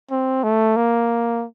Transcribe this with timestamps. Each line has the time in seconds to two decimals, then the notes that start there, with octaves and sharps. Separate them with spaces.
0.11 C4
0.43 A3
0.76 A#3